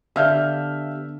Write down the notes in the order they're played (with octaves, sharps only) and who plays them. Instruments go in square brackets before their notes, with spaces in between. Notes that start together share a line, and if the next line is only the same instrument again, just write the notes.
[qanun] D3 [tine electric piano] B3 D4 G4 [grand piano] E5 [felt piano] F5 F6 G6